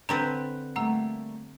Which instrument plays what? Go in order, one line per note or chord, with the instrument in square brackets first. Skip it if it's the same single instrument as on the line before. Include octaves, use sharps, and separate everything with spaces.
[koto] D3 C4 B4 [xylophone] A#5
[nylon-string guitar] G3 A3 A#3 [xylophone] F#5 A#5 E6